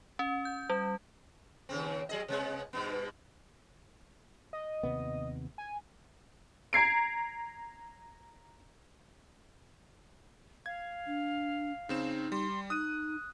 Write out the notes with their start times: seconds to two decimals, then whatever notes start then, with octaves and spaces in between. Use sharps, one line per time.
0.19 C#4
0.45 G6
0.70 G3
1.69 D#2 C#3 C4
2.09 F#3 G#4 D#5
2.28 C3 G#3 B3
2.73 G2 B2 B3
4.53 D#5
4.83 D#2 C3 B3
5.58 G#5
6.73 A#5 G#6 C7 D7
10.66 F5 G#6
11.07 D4
11.89 C#3 C4 D#4 E7
12.32 G3 C6
12.70 D#4 D#6 F#6 D#7